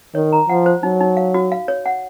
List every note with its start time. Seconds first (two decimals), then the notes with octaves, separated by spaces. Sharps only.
0.15 D#3 C#5
0.32 A#5
0.49 F3 F#5
0.66 C5
0.83 F#3 D#4
1.00 D#4
1.17 F5
1.34 F#4
1.52 F5
1.68 C#5
1.86 F#5